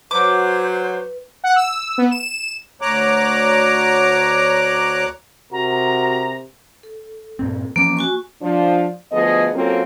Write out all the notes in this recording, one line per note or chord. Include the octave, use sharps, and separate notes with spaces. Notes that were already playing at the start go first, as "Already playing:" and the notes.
F#3 B4 C5 D6
F#5
E6
B3
E7
D2 C#5 A#5 D6 F#6
C3 F#4 A#4 A#5
A4
G2 A#2 C4
E3 F3 A#3 C#4 D6
F#4 G#5 C#6
F3 D4
D2 F3 B3 G#4 D#5
F#3 A#3 C4 C#4 F4 A4